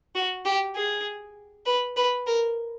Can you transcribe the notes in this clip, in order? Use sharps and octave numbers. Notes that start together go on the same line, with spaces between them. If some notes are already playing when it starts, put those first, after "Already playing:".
F#4
G4
G#4
B4
B4
A#4